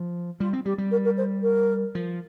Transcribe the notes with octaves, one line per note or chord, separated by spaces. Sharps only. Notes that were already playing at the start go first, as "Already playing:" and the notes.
Already playing: F3
G3 F4
C4
G3 G4
G3
A#4
A#4
C5
A#4
F3